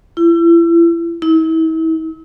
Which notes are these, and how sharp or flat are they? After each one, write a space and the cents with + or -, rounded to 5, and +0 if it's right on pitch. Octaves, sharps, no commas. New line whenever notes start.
E4 +35
E4 -40